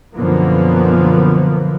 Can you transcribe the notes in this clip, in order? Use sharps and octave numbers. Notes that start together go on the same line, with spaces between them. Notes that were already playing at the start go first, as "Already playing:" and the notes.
F#2 B2 D3 F3 A#3 B3